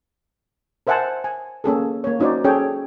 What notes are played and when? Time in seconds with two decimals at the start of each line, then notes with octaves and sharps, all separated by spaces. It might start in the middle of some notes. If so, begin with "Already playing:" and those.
0.87 A#4 C5 E5 F#5 G#5 A5
1.24 G#5
1.64 A#3 C#4 G#4 A4
2.04 A#3 C#5
2.19 C#4 D#4 F#4 C5 D5
2.44 C#4 G#4 A4 C#5 G5